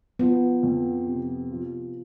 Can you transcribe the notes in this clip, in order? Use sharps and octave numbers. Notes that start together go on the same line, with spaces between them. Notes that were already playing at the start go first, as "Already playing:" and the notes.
F3 B3
F2
C3
F3